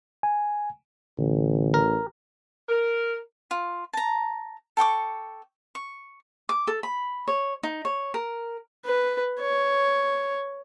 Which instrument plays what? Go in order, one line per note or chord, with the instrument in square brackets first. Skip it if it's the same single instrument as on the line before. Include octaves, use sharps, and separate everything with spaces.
[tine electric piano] G#5
[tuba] A1 [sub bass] D3
[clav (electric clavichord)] A#4
[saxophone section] A#4
[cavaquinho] F4
A5 A#5
A4 G5 C#6 D6
C#6
D6
A4
B5
C#5
D#4
C#5
A#4
[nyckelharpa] B4
C#5